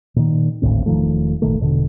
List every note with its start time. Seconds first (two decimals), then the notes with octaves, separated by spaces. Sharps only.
0.16 A#2 D#3
0.62 G#1 D2 A2 C4
0.86 E1 D#3 F3 A3
1.42 G#1 A#2 D#3 A3
1.60 E1 B2 D3